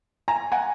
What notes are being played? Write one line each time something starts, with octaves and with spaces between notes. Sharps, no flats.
G#5 A#5
F#5 G#5